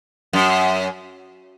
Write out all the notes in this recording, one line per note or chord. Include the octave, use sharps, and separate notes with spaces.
F#2